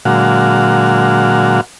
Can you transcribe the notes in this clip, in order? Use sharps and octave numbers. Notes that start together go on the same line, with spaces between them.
A#2 D3 F#3 G#3 F#4 F5